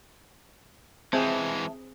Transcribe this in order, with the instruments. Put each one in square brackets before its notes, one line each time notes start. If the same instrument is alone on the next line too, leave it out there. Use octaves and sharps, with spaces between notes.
[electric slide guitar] E3 G#3 [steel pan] C4 G#4 [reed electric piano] E5 A5